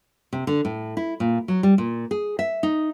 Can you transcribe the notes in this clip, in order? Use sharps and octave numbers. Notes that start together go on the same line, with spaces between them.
C3
D3
A2
E4
A#2
F#3
G3
A#2
G#4
E5
D#4